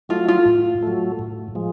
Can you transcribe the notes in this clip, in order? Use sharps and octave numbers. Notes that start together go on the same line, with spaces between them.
F#3 A3 F4
F4
A2
F#3 A3
A2
F3 G#3